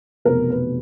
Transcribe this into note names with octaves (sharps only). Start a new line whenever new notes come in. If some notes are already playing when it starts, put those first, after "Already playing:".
F1 E2 B2 A#4
B4